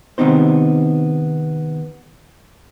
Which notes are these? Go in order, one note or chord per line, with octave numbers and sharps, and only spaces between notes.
C3 D#3 B3 C4 D#4 C5